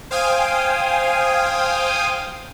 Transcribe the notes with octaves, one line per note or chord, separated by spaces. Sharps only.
C5 F5 G5 G#5 D#6